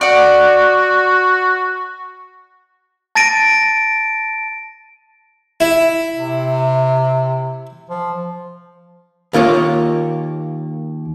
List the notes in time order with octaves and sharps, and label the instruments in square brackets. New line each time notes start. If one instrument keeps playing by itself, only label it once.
[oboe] F#4 [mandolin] D5 F#5
[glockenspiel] A5 A6 A#6 D7 D#7
[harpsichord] E4
[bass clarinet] C3
F3
[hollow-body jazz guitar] D#2 A#3 F4 C#5